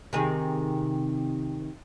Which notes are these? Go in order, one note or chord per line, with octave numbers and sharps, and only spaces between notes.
C3 D#3 G#4